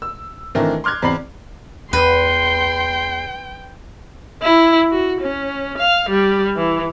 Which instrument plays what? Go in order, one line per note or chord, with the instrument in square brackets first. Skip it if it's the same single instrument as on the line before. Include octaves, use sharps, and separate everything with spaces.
[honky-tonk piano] E6
D#3 E3 A3 C4 D4 A#4
C6 D6 F6 F#6 G#6
E2 C4 D5 B5 C7 F#7
[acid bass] E2 [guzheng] B4 [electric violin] G5 [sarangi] C6
[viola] E4
F#4
C#4
F5
G3
E3